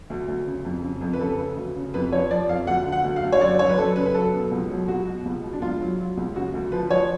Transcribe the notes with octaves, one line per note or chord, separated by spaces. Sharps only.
D2
D2
C#3
F2
C#3
F2
B4
C#3 A4
C#3
D2
C#3
F2 B4
F3 C#5
F3 D5
F2 F5
D2 F#5
D3
F#5
D2
F5
D2
C#5
F#2 D5
F#2 C#5
B4
F#2 A4
C#3 B4
B4
F#3 A4
B2
C#2
F#3
C#2 F#4
B2
C#2
B2
D4
C#2 F4
F#3
F#3
C#2
C#3 F#4
D2
F3 B4
F3 C#5